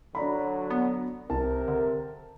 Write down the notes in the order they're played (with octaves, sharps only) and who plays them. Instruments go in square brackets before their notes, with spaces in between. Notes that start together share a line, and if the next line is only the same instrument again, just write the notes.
[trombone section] D3 F#3 [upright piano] D4 A#5 B5
[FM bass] B3
[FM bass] C2 [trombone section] C3 A#4 [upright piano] A5
[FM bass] D3